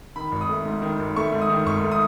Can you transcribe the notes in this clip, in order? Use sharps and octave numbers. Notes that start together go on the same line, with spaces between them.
D#3 B5
G#1
D#6
A3
G#2
D#3
G#1
A3 C#6
G#2
D#6
D#3
G#1 C#6
A3
D#6